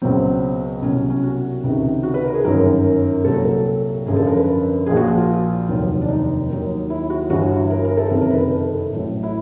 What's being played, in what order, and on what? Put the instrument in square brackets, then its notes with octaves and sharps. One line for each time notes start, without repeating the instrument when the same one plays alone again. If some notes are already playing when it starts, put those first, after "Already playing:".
[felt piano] C#2 B2 F#3 C4
C2 B2 F#3 C#4
C#4
C#4
F#4
C#2 C3 D#3
F#4
B4
A#4
G#4
G1 F#2 D#3 F#3 A#4
C2 A#2 F#3 A4
A#4
A4
G#1 F#2 D3 F3 G#4
A4
A#4
B4
A#1 A#2 F3 G#4
F#4
F#4
F4
F1 D#2 D#3 F#3
D4
D#4
D#2 D#3 F#3
E4
F#4
G1 G2 E3 F#4
A#4
A#4
A4
F#1 F2 C3 D#3 A4
A#4
B4
B4
A4
A1 A2 F#3
E4